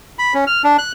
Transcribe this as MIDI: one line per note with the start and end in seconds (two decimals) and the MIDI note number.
0.19 0.34 83
0.34 0.45 61
0.47 0.62 89
0.64 0.77 62
0.78 0.92 90